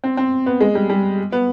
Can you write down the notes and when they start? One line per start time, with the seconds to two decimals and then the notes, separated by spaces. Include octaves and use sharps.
0.04 C4
0.17 C4
0.46 B3
0.61 G#3
0.75 G3
0.90 G3
1.32 B3